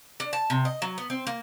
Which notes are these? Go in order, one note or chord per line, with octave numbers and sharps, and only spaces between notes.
D4
A5
C3
D#5
F#3
B3
C4
A#3